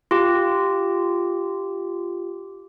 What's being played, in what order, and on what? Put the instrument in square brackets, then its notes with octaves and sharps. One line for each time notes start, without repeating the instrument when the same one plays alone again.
[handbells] F4 G4